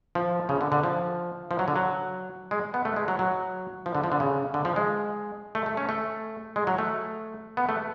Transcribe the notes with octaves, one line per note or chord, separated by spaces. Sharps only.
F3
C#3
D3
D3
F3
F3
F#3
D3
F#3
G#3
B3
A3
G#3
F#3
F#3
F3
D3
F3
D3
C#3
D3
F3
G#3
A3
A3
C#4
A3
G#3
F#3
A3
B3
A3